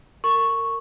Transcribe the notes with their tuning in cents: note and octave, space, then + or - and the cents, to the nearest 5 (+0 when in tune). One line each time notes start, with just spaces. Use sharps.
A#4 -30 C#6 +0